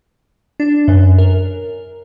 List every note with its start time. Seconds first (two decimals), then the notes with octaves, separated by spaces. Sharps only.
0.60 D4
0.88 F#2
1.18 A#4